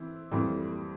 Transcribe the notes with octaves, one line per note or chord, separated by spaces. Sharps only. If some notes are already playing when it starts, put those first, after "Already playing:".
Already playing: E3 C4 E4
F2 E3 G3 C4